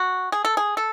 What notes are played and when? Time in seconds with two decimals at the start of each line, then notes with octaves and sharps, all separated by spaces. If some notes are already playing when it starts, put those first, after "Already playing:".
Already playing: F#4
0.32 G#4
0.45 A4
0.57 G#4
0.77 A4